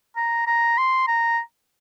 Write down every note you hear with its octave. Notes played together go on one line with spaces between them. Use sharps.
A#5
A#5
C6
A#5